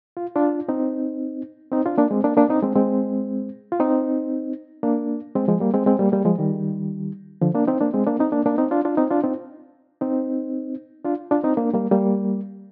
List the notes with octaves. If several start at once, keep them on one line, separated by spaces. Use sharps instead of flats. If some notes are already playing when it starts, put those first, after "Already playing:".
F4
D4 F4
C4 D#4
C4 D#4
D4 F4
A#3 D4
G#3 C4
A#3 D4
A#3 D4
C4 D#4
G#3 C4
G#3 C4
F4
C4 D#4
A#3 D4
G#3 C4
F3 G#3
G3 A#3
G#3 C4
G#3 C4
G3 A#3
G3 A#3
F3 G#3
D#3 G3
D3 F3
A#3 D4
C4 D#4
A#3 D4
G#3 C4
A#3 D4
C4 D#4
A#3 D4
A#3 D4
C4 D#4
D4 F4
D4 F4
C4 D#4
D4 F4
C4 D#4
C4 D#4
D4 F4
D4 F4
C4 D#4
A#3 D4
G3 A#3
G3 A#3